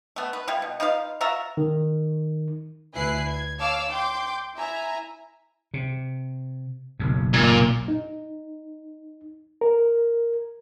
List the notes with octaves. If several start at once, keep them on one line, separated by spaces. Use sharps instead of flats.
A3 B3
B4
G3 E4 F4
B2
D#4 F4 B4 F5
F4 F#4 E5 A#5
D#3
D2 E4 B4 G#5 F#6 C7
G#6
C#5 F5 A5 D6 E6 F6
G5 C6 D6 G6
E4 E5 G#5 A#5
C3
F#1 B1 F#2
A#2
D#4
A#4